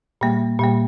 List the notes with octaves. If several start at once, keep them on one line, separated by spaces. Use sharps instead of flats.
A#2 G3 A#3
A#2 G3 A#3